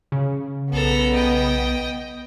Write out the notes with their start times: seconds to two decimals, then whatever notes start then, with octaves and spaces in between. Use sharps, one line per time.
0.12 C#3
0.73 B1 B3 A4 A#5
1.14 D#5 G5